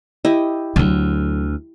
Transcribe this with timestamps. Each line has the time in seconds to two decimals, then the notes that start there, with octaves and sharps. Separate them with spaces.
0.25 E4 G4 D#5
0.76 D2 D3 F#3